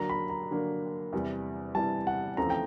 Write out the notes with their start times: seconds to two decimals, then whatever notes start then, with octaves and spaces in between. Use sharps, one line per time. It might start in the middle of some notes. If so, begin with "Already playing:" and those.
Already playing: D3 F#3 A#3 D4 A#5
0.09 B5
0.30 A#5
0.51 D3 F#3 A#3 D4
1.13 E2 C3 E3 G3
1.75 E2 C3 E3 G3 A5
2.07 F#5
2.37 E2 C#3 F3 A3 C4 A#5
2.50 G5